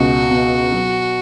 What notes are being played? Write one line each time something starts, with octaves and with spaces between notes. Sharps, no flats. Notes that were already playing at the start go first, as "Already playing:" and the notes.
Already playing: C#2 B2 F#4
B2
F#3